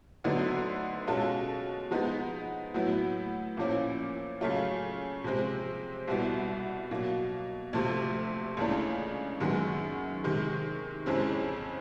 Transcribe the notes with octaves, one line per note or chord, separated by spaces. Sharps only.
D2 D3 F#3 B3 D#4
B2 G#3 C#4 F4 A4
F3 G#3 B3 D#4
A2 F#3 B3 E4
A#2 F3 A#3 C#4 E4
C#3 F#3 A3 C#4 F4
C3 F3 G#3 C4
C2 B2 G3 B3 E4
B2 F#3 A#3
D2 C3 F3 A3
C#2 C#3 E3 A3 D4
F#2 D#3 G#3 B3
C3 D#3 G#3
F2 C#3 E3 G#3 C4